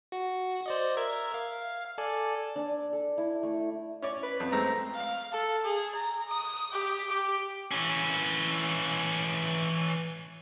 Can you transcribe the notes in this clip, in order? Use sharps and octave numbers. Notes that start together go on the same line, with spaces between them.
F#4
C5 D5 D#5
A#4 E5 G#6
F5
A4 D5 G#5
D4
A4
E4
A3
C#4 C#5 D5
B4
F2
G#3 A3 C4 A#5
F5
A4
G#4
A#5
D#6
G4
G4
E3 C#4